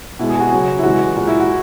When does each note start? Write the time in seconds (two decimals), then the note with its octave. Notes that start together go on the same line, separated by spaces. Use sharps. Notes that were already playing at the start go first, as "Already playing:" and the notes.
0.19 B2 G#3 E4
0.30 G#4
0.40 F#4
0.52 C#3 F#3
0.79 E4
0.83 C#3 E3 G#3 F#4
1.16 A#2 G#3 F#4
1.27 E4
1.40 F#4